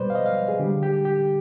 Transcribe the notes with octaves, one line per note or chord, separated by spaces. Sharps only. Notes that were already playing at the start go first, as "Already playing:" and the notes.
Already playing: B2 G3 B4 C5 D5
F5
D#5
F5
G#4
D3 G3 G4
G4
G4